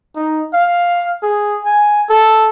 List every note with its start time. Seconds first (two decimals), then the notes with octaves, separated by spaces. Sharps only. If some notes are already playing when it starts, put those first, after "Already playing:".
0.16 D#4
0.53 F5
1.23 G#4
1.65 G#5
2.10 A4